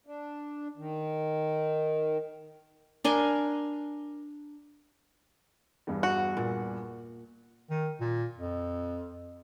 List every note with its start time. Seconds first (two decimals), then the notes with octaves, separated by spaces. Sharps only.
0.06 D4
0.77 D#3
3.04 D4 A#4 G#5 C6
5.87 E2 G2
6.03 F#4
6.37 A#2
7.70 D#3
8.01 A#2
8.38 F2